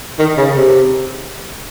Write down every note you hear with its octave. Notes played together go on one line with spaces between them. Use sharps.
D#3
C#3
C3